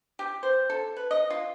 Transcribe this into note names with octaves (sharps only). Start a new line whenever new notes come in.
G4
C5
A4
B4
D#5
F4